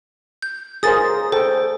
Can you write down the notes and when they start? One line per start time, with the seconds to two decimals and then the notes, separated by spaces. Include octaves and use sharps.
0.42 G6
0.83 G#4 A#4 C5 D#6 A6
1.32 A4 C5 G5